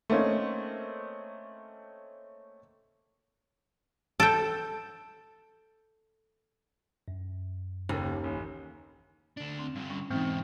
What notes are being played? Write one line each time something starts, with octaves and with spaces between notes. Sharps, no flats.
A3 A#3 C4 C#4 D#4
A4 G5
F#2
F#1 D#2
A1
D2 D4
C4
G2 D3
G3 C#4
G#2 B2 E3 C4 D#4